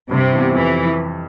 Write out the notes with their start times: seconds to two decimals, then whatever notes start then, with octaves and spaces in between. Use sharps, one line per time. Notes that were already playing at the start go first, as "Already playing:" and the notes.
0.11 G2 C3
0.33 E3 B3
0.55 F2 E3